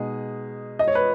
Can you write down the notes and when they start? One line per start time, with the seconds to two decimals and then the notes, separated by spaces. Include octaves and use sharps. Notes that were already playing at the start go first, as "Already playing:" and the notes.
Already playing: B2 G#3 D#4 G#4
0.79 D#5
0.88 C#5
0.95 B4